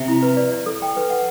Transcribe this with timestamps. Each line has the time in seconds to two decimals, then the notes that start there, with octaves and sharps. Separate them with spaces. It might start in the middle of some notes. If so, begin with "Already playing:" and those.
Already playing: C3
0.08 E4
0.22 B4
0.37 D5
0.52 D5
0.66 A4
0.82 G5
0.97 B4
1.10 F#5